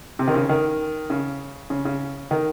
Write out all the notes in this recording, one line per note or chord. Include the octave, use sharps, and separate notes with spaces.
C3
D#3
C#3
D#3
C#3
C#3
C#3
D#3